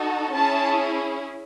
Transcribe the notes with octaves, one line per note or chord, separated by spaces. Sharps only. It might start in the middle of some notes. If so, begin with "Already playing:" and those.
Already playing: D#4 F#4 A4
C#4 E4 G#4 A5